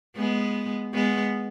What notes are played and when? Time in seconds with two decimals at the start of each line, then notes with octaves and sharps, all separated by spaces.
0.16 G#3 B3
0.93 G#3 B3